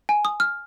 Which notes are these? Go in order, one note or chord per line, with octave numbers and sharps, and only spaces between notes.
G#5
D#6
F6